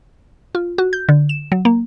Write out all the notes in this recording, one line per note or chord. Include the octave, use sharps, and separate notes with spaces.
F4
F#4
G6
D3
E7
F#3
A#3